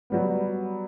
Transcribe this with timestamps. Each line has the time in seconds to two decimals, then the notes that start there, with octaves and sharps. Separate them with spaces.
0.10 F#3 G3 B3